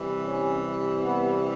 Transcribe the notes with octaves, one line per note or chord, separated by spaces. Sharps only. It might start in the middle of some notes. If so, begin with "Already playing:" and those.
Already playing: C3 E3 G3
C#4
B3